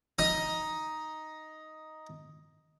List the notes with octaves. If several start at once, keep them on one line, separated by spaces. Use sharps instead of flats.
D#4 D#5